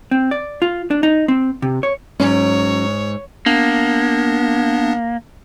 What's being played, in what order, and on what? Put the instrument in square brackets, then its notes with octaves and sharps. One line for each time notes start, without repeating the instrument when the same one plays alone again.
[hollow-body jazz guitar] C4
D5
F4
D4
D#4
C4
C3
C#5
[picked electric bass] G#2 [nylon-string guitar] F#3 C#4 [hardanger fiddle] C#5
[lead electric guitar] A#3 [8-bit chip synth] B3 D4